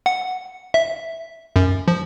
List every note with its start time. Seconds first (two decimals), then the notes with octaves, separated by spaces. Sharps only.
0.06 F#5
0.74 E5
1.56 F#2
1.88 F3